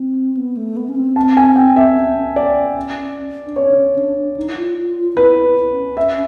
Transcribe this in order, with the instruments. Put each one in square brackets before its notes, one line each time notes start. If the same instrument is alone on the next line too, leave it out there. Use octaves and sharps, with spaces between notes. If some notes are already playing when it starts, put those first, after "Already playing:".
Already playing: [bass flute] C4
B3
A3
B3
C#4
C4
[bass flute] C4 [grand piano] A5
[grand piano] G#5
G5
E5
[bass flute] C#4
C4
C#4
[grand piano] D5
[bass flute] D4
[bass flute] C#4 [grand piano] C#5
[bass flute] D4
C#4
D4
D4
D#4
E4
F4
F4
F4
F4
[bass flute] E4 [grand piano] B4
[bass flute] C#4
[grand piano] E5